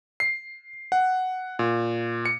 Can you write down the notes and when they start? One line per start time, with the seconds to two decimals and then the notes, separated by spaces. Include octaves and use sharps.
0.20 C7
0.92 F#5
1.59 A#2
2.26 C#7